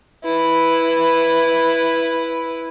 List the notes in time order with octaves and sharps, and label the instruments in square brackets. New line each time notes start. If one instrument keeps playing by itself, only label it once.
[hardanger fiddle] E4 B4